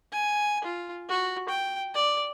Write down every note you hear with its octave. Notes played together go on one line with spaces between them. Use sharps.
G#5
F4
F#4
G5
D5